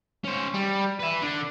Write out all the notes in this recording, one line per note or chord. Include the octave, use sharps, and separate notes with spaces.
C#4 C5
G3
B4 E5
D3 D4